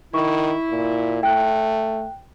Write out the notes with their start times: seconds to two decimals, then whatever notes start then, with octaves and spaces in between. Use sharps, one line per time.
0.14 D#3 E4 C#6
0.70 A#2
1.23 A3 G5 F#6